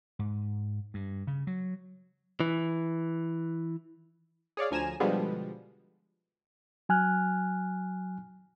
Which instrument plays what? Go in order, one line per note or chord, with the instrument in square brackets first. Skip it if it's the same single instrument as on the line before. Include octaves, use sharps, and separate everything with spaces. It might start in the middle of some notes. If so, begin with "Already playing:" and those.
[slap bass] G#2
G2
C#3
F#3
[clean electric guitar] E3
[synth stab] G#4 C#5 D5 F5
D2 F3 G#5 A#5 E7
B2 D3 F3 G3 G#3 B3
[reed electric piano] F#3 G#5 F6 F#6